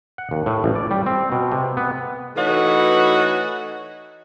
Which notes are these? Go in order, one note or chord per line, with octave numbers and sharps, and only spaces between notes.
F#5
D#2
A2
A1
D5
G3
C4
B2
C3
B3
E3 A3 D#4 F#4 B4 C#5